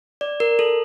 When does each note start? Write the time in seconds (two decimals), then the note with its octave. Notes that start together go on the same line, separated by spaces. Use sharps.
0.21 D5
0.40 A#4
0.59 A4